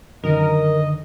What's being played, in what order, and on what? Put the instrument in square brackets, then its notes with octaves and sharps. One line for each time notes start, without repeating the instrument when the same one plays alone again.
[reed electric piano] F#2 D#3 [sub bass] D3 [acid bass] A#4 [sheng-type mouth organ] D#5